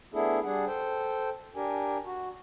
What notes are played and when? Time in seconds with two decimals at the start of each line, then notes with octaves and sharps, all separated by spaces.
0.14 A3 B3 D4 E4 G#4 A4
0.44 G3 D4 G#4 F#5
0.67 A4 C5 G5
1.56 D4 G4 A#4 G#5
2.05 F#4